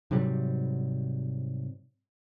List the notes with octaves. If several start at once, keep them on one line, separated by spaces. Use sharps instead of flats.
G#2 C3 F#3 G3